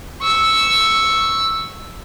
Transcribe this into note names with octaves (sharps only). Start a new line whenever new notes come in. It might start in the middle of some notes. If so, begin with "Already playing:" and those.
C#6 E6